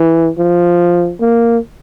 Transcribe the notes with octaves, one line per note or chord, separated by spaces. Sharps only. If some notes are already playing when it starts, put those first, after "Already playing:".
Already playing: E3
F3
A#3